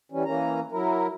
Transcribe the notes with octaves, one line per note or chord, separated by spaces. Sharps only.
E3 G3 C#4
E3 A#3 C#4 A#5
F#3 E4 A#4